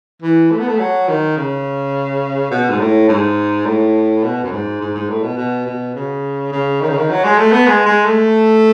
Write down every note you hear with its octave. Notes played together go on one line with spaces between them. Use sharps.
E3
A3
B3
A3
F#3
D#3
C#3
B2
G#2
A2
G#2
A2
B2
F#2
G#2
G#2
G#2
A2
B2
B2
B2
C#3
C#3
D#3
C#3
D#3
F#3
G#3
A3
B3
G#3
G#3
A3